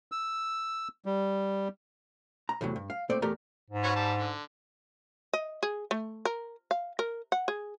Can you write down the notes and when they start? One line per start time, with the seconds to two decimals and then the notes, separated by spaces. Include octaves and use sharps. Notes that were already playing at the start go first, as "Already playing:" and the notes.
0.12 E6
1.06 G3
2.49 A#5
2.61 E2 A2 C3 F#3
2.76 G2
2.90 F5
3.10 A#2 A3 C4 D5
3.22 E2 A3 G4 A#4 D5 A#5
3.70 G#2
3.83 C#4 F#4 B4
3.96 G3 A5
4.18 D3
5.33 D#5
5.63 G#4
5.91 A3
6.25 A#4
6.71 F5
6.99 A#4
7.32 F#5
7.48 G#4